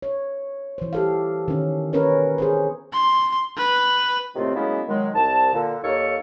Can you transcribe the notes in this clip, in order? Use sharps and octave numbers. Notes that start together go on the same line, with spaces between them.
C#5
E3 C5
G4 A4 F5
D#3 C#4
B3 C#4 A#4 B4 C#5
G#4 A#4 C5
C6
B4
A2 C3 D#3 A3 C4 F4
F#3 G#3 A#3 B3 C#4 E4
D#3 F#3 G#3
C2 A5
A#2 D3
D#2 D#3 A#3 A4 C#5